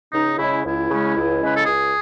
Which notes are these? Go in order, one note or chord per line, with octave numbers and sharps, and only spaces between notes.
C#2 D#4
C#3 G#3 C#4 E4
C#2 E4
C#3 G#3 C#4
C#2
C#3 G#3 C#4 B4
A4
C#2 G#4